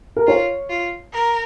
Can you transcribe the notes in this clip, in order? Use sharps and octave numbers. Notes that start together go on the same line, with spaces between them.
A#4
F4 C#5
F4
A#4